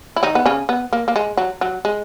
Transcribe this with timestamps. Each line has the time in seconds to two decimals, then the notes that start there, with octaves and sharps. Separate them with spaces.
0.16 E4
0.23 D#3 D#4
0.35 B3
0.46 C#3 C#4
0.69 B3
0.93 A#3
1.08 A#3
1.16 G#3
1.37 F#3
1.61 F#3
1.85 G#3